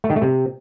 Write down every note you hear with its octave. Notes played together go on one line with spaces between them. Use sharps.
A3
D#3
A3
C3